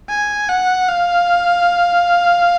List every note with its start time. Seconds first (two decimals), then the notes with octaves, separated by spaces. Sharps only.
0.09 G#5
0.49 F#5
0.88 F5